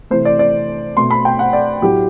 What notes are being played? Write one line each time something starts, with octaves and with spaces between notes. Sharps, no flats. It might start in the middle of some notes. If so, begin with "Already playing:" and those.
C3 E3 A3 C5
D5
D5
B2 A3 C6
B5
G5
F#5
D5
A2 F#3 A3 G4